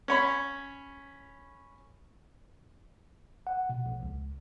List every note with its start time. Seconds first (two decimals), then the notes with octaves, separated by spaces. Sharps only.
0.08 C#4 C#5 B5
3.47 F#5
3.69 B2
3.86 A#1
4.03 C#2